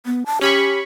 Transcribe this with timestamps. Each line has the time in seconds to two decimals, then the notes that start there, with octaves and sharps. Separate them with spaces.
0.06 B3
0.26 A5
0.41 C#4 G4 B5 C#6